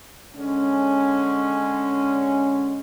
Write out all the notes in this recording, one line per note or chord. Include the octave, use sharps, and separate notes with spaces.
D3 G#3 C#4